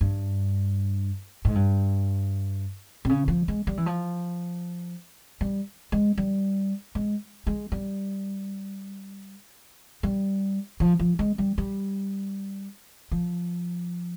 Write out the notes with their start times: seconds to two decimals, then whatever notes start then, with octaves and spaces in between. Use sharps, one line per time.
0.01 G2
1.45 G#2
1.55 G2
3.05 C3
3.09 C#3
3.28 F3
3.48 G#3
3.67 G3
3.77 E3
3.86 F3
5.41 G3
5.92 G#3
6.18 G3
6.95 G#3
7.47 G#3
7.72 G3
10.03 G3
10.80 F3
10.99 F3
11.19 G#3
11.38 G3
11.58 G3
13.11 F3